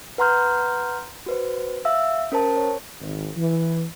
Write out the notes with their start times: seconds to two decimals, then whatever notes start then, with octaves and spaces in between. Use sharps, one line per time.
0.18 B4 F#5 A#5 C6 F6 G6
1.26 F#4 B4 C5
1.85 E5 F5 E6
2.32 C#4 A#4 C5 A5
2.57 C#5
3.01 G#1
3.37 E3